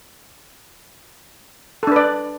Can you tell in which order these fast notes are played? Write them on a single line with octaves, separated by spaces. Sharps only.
A4 D4 B4 D5